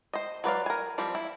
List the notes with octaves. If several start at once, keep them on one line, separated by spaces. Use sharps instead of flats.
C5 D#5
F#3 B4 D5 F5
A#4 G#5
F3 G3 C4 G4
E4